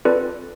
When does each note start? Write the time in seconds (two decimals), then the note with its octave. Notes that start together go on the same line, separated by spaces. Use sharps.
0.05 C4 F4 A4 B4 D5